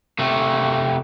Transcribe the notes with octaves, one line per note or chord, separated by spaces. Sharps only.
C3 A3